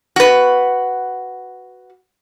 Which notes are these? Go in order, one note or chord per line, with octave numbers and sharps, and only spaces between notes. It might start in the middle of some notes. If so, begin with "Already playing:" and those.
F#4 B4